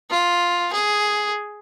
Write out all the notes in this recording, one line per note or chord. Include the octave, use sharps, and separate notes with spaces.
F4
G#4